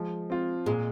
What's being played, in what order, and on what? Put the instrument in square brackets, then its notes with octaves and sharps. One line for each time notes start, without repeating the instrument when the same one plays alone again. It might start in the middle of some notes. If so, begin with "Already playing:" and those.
Already playing: [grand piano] F3 [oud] G#3
[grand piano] C4 F4
[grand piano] A#2 [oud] G#3